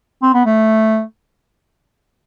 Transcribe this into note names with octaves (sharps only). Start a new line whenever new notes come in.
C4
B3
A3